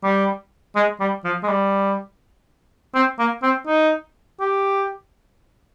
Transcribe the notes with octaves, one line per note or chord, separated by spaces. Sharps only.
G3
G#3
G3
F3
G#3
G3
C4
A#3
C4
D#4
G4